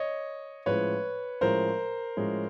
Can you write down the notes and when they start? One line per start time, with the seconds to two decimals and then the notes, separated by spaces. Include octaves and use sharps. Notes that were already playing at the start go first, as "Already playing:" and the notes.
Already playing: C#5 D#5
0.66 A2 F3 G#3 C#4 B4 C#5
1.41 A2 F3 G#3 C#4 A#4 C5
2.16 A2 F3 G#3 C#4